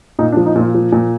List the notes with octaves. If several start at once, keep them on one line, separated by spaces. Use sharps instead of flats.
A#2 D#4
D4
F3
D#4
A#2 F4
F3
A#2